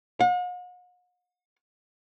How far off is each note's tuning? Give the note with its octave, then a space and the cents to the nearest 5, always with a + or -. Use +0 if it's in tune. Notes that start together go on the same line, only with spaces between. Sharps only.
F#5 -45